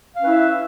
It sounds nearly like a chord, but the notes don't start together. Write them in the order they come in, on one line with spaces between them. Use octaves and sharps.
F5 C#4 B4 E4 E5